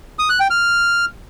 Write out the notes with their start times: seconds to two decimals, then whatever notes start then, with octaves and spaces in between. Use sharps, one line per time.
0.19 D#6
0.29 F#6
0.40 G5
0.50 F6